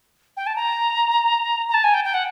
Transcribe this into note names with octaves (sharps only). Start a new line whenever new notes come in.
G5
A5
A#5
A#5
A5
G#5
G5
G5
F#5